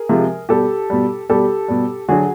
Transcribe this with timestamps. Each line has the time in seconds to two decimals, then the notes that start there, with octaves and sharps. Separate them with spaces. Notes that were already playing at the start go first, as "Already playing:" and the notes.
Already playing: G#4 A#4
0.09 C3 F3 G#3
0.49 B2 G3 G4 A4
0.90 B2 G3
1.29 B2 G3 G4 A4
1.68 B2 G3
2.08 D3 F#3 F#4 G#4